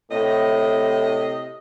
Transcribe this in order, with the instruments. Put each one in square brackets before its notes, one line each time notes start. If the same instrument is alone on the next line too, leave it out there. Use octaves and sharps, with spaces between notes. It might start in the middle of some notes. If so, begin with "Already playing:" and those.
[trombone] A2 [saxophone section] C3 D#5